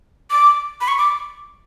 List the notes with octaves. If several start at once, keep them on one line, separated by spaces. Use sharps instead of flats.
D6
B5
C#6
D6